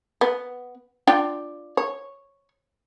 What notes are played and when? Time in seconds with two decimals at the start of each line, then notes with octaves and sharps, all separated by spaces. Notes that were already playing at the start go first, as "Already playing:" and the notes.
0.21 B3
1.07 D4 F4 G5
1.77 C#5